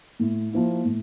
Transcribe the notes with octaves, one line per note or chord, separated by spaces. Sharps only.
A2
F3 A#3 E4
A2